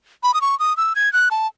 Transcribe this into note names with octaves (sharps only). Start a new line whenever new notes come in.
B5
D#6
C#6
D#6
E6
G#6
F#6
A5